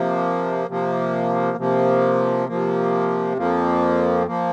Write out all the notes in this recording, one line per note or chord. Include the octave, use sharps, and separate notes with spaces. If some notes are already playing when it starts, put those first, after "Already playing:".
Already playing: C3 F3 A#3
C3 F3 A#3
C3 F3 A#3
C3 F3 A#3
F2 F3 A#3
F3 A#3